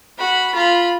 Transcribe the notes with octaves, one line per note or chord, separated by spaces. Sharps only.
F#4 B5
F4 B5